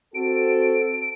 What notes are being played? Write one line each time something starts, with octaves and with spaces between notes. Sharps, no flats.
C4 F#4 A4 D7